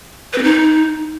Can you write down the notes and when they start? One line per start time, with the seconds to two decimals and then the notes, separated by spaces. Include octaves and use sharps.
0.33 B4
0.38 C4
0.43 D#4